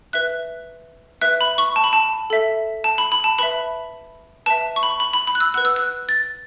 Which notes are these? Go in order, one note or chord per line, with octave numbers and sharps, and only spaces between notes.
B4 E5 F#6
B4 E5 F#6
B5
C#6
A5
B5
A5
A4 E5
A5
B5
B5
A5
B4 E5 B5
B4 E5 A5
C#6
B5
B5
B5
B5
F#6
E6
B4 F#5 F#6
E6
F#6
A6